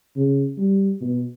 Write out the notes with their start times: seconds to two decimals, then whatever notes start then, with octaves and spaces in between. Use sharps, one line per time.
0.16 C#3
0.58 G3
1.01 B2